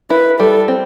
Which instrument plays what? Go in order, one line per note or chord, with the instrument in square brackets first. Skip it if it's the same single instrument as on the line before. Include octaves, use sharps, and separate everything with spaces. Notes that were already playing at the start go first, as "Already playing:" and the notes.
[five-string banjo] E4 [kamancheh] B4
[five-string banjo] G3 [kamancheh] A4
[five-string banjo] C4